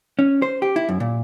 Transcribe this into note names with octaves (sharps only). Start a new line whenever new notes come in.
C#4
C5
G4
E4
F#2
A#2